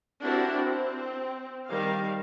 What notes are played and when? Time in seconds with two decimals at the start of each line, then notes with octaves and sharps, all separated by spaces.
0.22 C4 D4 E4 F#4 G4 A#4
0.65 C4
1.67 D#3 G3 F5